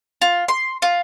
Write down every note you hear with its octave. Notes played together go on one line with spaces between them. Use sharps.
F4
C6
F4